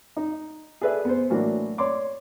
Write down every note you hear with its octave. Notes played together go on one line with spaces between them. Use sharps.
D#4
G#4 A4 B4 D5 E5
B3 C5
A2 E3 F#3 A#3 D4 F#4
C#5 D5 C6 D6